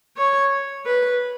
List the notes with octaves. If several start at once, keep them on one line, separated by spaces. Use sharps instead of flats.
C#5
B4